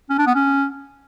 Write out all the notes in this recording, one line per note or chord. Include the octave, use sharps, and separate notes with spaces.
C#4
D4
B3
C#4